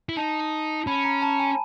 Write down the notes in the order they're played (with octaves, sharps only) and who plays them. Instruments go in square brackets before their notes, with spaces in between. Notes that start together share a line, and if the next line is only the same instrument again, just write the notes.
[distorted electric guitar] E4
[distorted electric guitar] D#4 [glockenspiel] A5
[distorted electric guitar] C#4 [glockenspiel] B5
[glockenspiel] A#5
A5
G#5